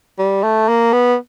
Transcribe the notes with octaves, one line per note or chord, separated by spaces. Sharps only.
G3
A3
A#3
B3